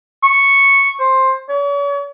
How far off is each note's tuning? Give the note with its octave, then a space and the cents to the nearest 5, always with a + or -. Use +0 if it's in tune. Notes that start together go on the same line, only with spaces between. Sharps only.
C#6 -5
C5 +10
C#5 +40